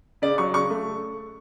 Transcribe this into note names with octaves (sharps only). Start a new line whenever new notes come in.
C#3 D5
F#3 C#6
C#3 C#6
A3